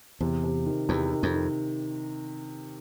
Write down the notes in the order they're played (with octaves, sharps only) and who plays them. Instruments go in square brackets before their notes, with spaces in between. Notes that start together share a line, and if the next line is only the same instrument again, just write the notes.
[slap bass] E2 [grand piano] C3
[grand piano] C3
D#3
[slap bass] E2 [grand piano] C3
[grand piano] D#3
[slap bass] F2
[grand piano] D#3